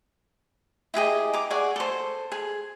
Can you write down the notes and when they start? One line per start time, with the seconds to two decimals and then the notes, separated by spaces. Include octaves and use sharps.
0.94 E4 G4 G#4 D#5
1.34 A#5 D6
1.50 G#4 D5 F#5 C#6
1.76 A4 C5
2.32 G#4